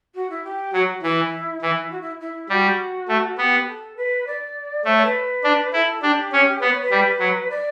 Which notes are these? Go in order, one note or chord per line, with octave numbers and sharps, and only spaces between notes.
F#4
E4
G4
F#3 F#4
E3 E4
E3 E4
F#4
E4
E4
G3 F#4
A3
B3 G4
A4
B4
D5
A3 C#5
C#5
B4
D4
E4 A4
D4 G4
C#4
B3 B4
C#5
B4
G3
F#3
D5